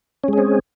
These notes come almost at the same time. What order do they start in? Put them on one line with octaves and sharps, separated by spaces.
C#4 G#3 G#4 C4